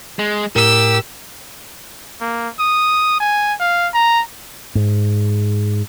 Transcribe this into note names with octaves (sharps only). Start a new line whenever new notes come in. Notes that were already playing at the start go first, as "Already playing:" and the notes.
G#3
A2 G4 A#4 E6
A#3
D#6
G#5
F5
A#5
G#2